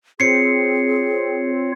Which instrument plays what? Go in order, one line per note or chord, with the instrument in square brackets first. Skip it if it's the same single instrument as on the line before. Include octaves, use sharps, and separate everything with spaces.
[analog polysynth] C4 [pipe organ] F4 C#5 [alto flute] G#4 [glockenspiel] C7 C#7